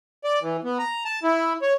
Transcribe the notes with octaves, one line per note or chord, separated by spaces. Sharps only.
D5
E3
B3
A#5
A5
E4
C#5